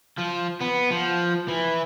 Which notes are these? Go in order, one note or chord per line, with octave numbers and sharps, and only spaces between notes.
F3
B3
F3
E3